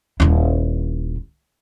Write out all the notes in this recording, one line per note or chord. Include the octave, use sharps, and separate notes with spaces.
D#1 E4